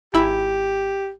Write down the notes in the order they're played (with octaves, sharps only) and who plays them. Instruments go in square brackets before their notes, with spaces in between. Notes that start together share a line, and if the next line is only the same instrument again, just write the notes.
[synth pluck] G#1 E4 [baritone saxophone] G4